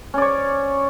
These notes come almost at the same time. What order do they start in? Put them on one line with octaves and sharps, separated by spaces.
C#4 D5 C#5